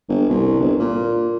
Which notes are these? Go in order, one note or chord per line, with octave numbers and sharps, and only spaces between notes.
G1
C2
G1
A#2